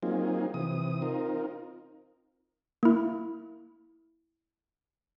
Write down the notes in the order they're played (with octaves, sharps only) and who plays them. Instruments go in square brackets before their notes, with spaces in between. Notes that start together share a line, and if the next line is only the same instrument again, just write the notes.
[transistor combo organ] F#3 A#3 C4 D#4 F4 G#4
C3 E3 D#6
C4 D#4 F4 A#4
[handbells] A#3 E4